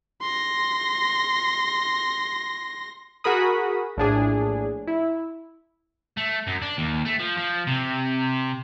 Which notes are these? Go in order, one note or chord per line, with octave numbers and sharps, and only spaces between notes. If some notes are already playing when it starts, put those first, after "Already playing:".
C6 A#6
F#4 G#4 A#4 B5 D#6
A#1 A2 D4 G#4
E4
A3
F#2
D4
D#2
A3
F3
F3
C3